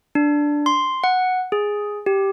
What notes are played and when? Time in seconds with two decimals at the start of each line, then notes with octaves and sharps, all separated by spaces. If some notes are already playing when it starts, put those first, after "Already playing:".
0.15 D4
0.66 C6
1.04 F#5
1.52 G#4
2.06 G4